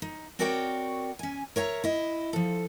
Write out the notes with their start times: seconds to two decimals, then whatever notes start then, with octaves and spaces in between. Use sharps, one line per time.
0.02 D#4
0.39 C4 F#4 A#4 C#5 D5 G5
1.19 C#4 G#5
1.56 A#4 C#5 E5 A#5
1.84 E4 D#5
2.33 F3 A4